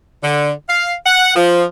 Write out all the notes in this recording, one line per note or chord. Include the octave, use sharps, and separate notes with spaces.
D3
F5
F#5
F3